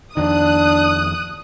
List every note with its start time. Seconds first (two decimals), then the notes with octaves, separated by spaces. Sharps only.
0.17 F2 D#3 D4 D#6 F#6